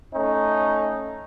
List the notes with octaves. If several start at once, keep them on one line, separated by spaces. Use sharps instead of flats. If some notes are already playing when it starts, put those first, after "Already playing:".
A3 C#4 D#4